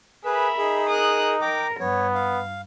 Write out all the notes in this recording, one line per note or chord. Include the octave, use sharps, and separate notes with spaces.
G#4 A#4 B4 E5 B5
D#4 G#4
A#4 D#6 F#6
A#4 G5 D6
G2 B3 C#5
F5